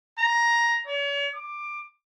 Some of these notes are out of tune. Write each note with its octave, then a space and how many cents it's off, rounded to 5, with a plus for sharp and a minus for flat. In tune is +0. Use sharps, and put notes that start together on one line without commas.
A#5 +10
C#5 +40
D6 +15